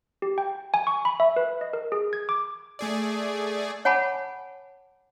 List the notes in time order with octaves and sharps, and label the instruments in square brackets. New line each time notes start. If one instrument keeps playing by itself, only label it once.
[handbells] G4
G5
G#5
C#6
B5
E5
B4
D#5
A#4
G#4
G#6
D6
[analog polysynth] A3 G#4 D5
[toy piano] C#5 F#5 G#5 A5 B5 D6